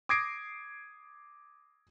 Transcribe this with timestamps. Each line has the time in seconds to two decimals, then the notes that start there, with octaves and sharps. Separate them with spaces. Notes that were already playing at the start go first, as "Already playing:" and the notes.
0.09 D6 D#6 G#6 A#6 C7 D7